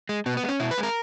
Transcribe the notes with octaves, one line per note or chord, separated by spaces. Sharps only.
G#3
B2 B3
B3
G#3
C#4
B2 E4
B4
G#3
A#4